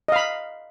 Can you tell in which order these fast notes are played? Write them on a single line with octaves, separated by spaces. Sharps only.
D#5 F5 B5